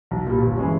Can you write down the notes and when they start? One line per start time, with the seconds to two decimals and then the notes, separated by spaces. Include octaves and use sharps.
0.11 B1
0.26 A#2 G3
0.42 G1
0.57 E3 G#3 C#4